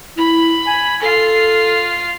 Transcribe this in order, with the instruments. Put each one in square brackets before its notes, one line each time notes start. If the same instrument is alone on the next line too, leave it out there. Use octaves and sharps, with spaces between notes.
[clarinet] E4 [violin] B5
[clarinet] G#5
[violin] F4 C7 [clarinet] A4